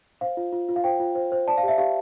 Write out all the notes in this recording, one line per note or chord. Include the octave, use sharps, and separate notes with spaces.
C5 F5
F4
F4
F4
F5
C5 G5
F4
C5
C5
D5 A5
F5
G4 E5
G4 F5